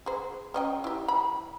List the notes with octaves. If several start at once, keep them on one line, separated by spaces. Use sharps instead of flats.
G#4 C5
C#4 D#5 G5
E4 G4
B5